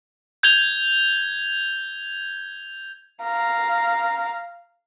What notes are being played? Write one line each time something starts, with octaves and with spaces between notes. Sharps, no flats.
G6 G#6 F7 G7
F5 A#5